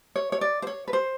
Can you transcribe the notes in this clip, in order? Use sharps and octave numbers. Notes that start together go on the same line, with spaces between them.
C#5
C#5
D5
C5
C#5
B4
C5